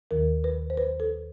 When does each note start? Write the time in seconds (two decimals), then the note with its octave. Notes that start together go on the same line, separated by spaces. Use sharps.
0.11 D#2 D#3 A#4
0.44 B4
0.70 C5
0.77 B4
1.00 A4